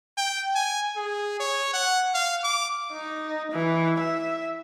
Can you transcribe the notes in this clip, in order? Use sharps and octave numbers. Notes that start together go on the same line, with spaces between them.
G5
G#5
G#4
C#5
F#5
F5
D6
D#4
E3
E5